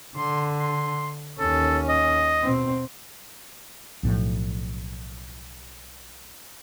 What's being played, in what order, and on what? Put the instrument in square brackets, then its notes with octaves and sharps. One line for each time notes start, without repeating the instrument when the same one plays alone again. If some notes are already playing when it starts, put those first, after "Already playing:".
[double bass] D3 [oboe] C6
[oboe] C6
[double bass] D#2 C#4 [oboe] A4
[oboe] D#5
[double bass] B2 C4
[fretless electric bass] B1 A2 F3